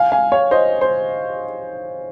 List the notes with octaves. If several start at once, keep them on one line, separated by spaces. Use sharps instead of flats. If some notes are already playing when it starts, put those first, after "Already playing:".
Already playing: F5 G#5
F5 G#5
C#5 F5
C5 D#5
C5